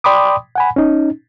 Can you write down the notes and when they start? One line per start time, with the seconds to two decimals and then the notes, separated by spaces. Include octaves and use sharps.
0.04 D5 G5 B5 C6 D6 D#6
0.55 F#5 G#5 B5
0.76 C#4 D#4